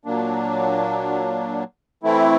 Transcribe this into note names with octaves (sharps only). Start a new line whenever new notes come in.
A#2 F#3 A#3 D4
E3 A3 C4 E4